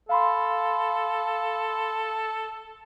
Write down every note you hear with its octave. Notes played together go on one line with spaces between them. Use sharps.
A4 F5 B5 C6